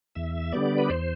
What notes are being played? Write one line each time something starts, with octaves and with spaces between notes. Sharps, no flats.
E2 E5
D3 G3 B3 D5
B4
E2 C5